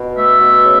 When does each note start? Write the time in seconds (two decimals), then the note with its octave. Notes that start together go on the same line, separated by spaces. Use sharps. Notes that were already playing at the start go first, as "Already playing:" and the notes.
Already playing: B2
0.17 A3 E5
0.41 B2
0.65 C#3